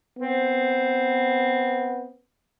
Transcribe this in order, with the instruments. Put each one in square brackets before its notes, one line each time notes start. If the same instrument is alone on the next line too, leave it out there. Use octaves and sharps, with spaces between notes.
[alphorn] B3 [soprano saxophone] C4